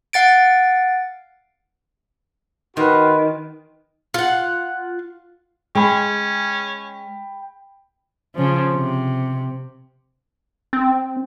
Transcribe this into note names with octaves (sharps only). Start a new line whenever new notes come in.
F5 F#5 A6 D7
D#3 F#4 B4 C6
F4 F#5
G#3 C#4 G5 B5
C#3 F3
C3
C4